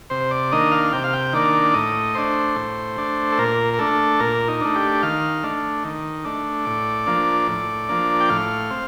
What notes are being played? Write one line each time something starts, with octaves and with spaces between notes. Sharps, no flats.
C3 C5
D5
D#3 A#3 D4 D#5
F5
C3 G5
F5
G5
D#3 A#3 D4 D5
A2 D#5
A3 D4 C5
A2
A3 D4
A4
A#2 A#4
A#4
A3 D4 A4
A#2 A#4
D#4
A3 D4
G4
D#3 F5
A3 D4
D#3
A3 D4
A2 D5
F3 A#3 D4
A2
F3 A#3 D4
G5
A2 F5
C4